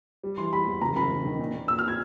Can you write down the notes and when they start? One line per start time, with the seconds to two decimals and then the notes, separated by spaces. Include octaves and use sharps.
0.23 G3
0.38 E3 C6
0.53 G3 B5
0.67 E2
0.81 F#1 A#5
0.96 F#1 B5
1.10 F#1
1.25 D#3
1.39 A#2
1.54 A#3
1.68 A#3 E6
1.79 F6
1.88 G#6